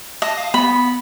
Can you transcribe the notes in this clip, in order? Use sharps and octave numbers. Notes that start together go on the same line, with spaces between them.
D#5 A5
F5
B3 B5